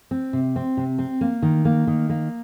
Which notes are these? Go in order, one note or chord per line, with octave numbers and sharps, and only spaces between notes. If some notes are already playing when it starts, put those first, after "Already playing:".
C4
C3
C4
C3
C4
A#3
D#3
A#3
D#3
A#3